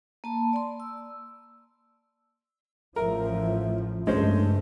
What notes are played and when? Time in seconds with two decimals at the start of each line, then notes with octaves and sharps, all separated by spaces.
0.24 A#3 A5 B5
0.53 D5 C6
0.80 E6
2.96 A1 A2 F3 A#4 E5
4.07 C#2 G2 G#3 A3 C#4 D4 C5